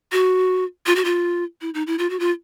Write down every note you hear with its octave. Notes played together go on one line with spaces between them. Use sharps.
F#4
F4
F#4
F4
E4
D#4
E4
F4
F#4
F4